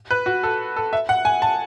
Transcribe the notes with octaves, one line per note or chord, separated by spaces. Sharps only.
B4
F#4
A4
A4
E5
F#5
G#5
A5